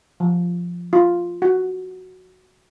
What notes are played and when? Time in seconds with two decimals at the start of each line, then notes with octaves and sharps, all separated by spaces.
0.20 F3
0.93 F4
1.42 F#4